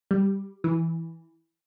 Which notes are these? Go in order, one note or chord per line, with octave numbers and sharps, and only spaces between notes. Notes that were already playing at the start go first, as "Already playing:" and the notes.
G3
E3